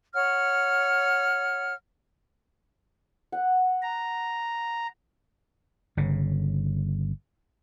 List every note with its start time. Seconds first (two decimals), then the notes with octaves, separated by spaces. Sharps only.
0.14 C#5 F#5 F6
3.32 F#5
3.82 A#5
5.97 G1 C#3